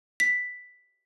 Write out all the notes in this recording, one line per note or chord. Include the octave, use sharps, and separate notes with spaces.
B6